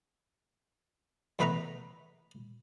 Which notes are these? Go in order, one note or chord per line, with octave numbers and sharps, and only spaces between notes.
E2 A3 B3 B4 E5 A#5